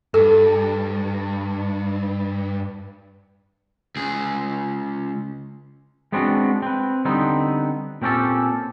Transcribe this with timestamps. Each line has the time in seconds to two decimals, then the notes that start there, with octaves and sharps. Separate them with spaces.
0.14 G2 A4
3.96 C#2 G#4
6.12 G#3 B3 C4 D4 F#4
6.62 C4 B4
7.05 D3 G3 B3 C4 D#4
8.02 A#2 C4 C#4 G4 A4